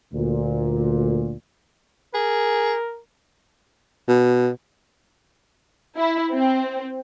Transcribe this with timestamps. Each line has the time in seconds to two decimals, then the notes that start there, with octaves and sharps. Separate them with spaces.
0.14 D2 A#2
2.14 G#4 A#4
4.08 B2
5.97 E4
6.32 C4